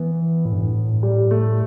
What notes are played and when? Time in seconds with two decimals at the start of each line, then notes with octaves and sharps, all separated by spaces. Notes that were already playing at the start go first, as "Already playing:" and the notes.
Already playing: E3 B3
0.45 A2
0.53 G2
0.62 A2
1.03 G3
1.31 A3